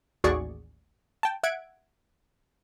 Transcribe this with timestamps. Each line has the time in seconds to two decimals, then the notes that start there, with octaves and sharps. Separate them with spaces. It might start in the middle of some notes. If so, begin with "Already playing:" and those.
0.24 A1 D#2 F#4 G#4 D5 C#6
1.23 G5 A5
1.43 E5 F#5 F#6 G#6 D7